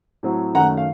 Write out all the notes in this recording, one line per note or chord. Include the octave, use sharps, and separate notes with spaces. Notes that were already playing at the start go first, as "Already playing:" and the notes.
A2 F#3 C4
F#2 D#3 A3 C#4 F#5 A#5
F5